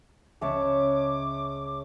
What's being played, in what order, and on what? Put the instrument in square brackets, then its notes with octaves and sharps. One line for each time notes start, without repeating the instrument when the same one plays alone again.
[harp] C#2 G#3 [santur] C#5 E5 A5 [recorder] D6